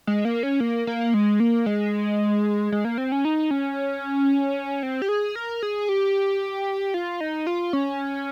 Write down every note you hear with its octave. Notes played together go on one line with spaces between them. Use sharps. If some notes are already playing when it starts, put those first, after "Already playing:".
G#3
A#3
C#4
A#3
A#3
G#3
A#3
G#3
G#3
A#3
C4
C#4
D#4
C#4
C4
G4
G#4
A#4
G#4
G4
F4
D#4
F4
C#4